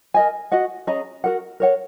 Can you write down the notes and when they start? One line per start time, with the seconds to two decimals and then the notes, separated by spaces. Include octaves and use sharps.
0.14 A#4 D#5 G#5
0.52 F#4 D#5 F#5
0.87 C#4 G#4 D#5 A#5
1.24 F#4 A#4 F#5
1.60 A#4 C#5 F#5